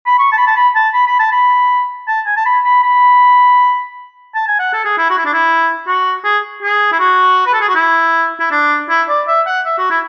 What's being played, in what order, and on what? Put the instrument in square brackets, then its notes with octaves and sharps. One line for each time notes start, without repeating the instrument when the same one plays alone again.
[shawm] B5
C#6
A5
B5
A5
B5
A5
B5
B5
A5
B5
A5
G#5
A5
B5
B5
B5
A5
G#5
F#5
A4
G#4
E4
F#4
E4
D4
E4
F#4
G#4
G#4
E4
F#4
B4
A4
G#4
F#4
E4
E4
D4
E4
D5
E5
F#5
E5
F#4
E4